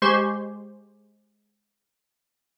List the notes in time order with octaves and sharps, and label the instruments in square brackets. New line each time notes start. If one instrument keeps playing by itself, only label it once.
[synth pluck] G#3 G4 C5 C6 C#6